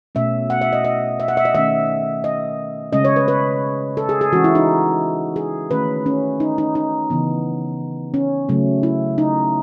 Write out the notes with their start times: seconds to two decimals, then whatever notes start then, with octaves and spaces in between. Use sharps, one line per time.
0.15 B2 A3 C#4 E5
0.50 F#5
0.61 E5
0.73 D#5
0.85 D#5
1.20 E5
1.28 F#5
1.37 E5
1.45 D#5
1.54 D#3 A3 C#4 E5
2.24 D#5
2.93 C#3 G#3 C#4 D#5
3.05 C#5
3.16 B4
3.28 B4
3.97 A4
4.09 G#4
4.21 G#4
4.32 E3 G#3 C#4 F#4
4.44 E4
4.55 D#4
5.36 G#4
5.71 D#3 A3 C#4 B4
6.06 C#4
6.40 D#4
6.58 D#4
6.75 D#4
7.10 C#3 E3 B3
8.14 C#4
8.49 C#3 F#3 A3 C#4
8.83 E4
9.18 D#4